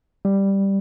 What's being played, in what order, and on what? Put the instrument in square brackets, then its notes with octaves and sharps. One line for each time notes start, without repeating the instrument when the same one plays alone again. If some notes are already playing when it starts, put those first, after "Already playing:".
[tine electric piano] G3